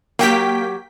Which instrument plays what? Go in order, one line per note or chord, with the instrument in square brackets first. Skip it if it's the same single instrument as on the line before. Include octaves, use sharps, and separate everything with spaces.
[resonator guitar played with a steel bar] F#3 G4 [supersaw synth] A#3 G5 B6